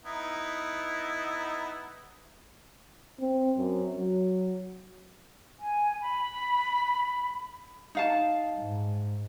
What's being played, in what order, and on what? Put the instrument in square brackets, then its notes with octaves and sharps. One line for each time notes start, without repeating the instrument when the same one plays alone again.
[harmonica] B3 D#4 E4
[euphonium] C4
F#2
F#3
[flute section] G#5
B5
[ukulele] D#4 F5 A5
[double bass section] G#2